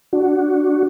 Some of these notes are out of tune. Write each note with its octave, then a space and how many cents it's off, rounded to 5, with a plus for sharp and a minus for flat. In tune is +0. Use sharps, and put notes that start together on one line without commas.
D4 +0 F#4 +0